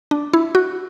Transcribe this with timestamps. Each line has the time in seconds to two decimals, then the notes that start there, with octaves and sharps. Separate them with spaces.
0.11 D4
0.33 E4
0.55 F#4